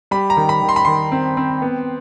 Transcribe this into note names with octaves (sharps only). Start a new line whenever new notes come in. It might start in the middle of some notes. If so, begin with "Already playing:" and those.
G3 B5
A#5
D#3
B5
D#3
C6
B5
D#3 C6
C4
C4
B3